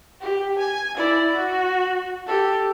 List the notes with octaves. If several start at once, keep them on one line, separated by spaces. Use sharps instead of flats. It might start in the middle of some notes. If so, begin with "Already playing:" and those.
G4
G#5
E4 D5
F#4
G4 A4